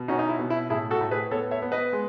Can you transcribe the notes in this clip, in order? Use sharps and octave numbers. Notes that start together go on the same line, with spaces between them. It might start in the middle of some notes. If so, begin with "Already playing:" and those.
Already playing: B2
C#4 D#4 F#4
D#4
E4
B2
E4
A2 E4 G#4
F#4 A4
A2
G#4 B4
B3 A4 C#5
C#5 E5
B3
B4 D#5
G#3